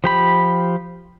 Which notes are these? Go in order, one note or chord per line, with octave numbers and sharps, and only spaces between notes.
F3 G4 B5